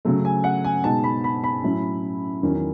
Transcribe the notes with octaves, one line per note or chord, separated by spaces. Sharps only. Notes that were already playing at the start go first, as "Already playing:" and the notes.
C#3 F#3 A3
G#5
F#5
G#5
B2 G#3 D#4 A5
B5
B5
B5
A2 F#3 C#4 E4
E2 D#3 F#3 C#4